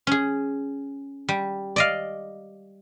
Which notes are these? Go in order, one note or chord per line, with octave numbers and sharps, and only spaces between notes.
C#4 G#4
G3
D5 D#5 F5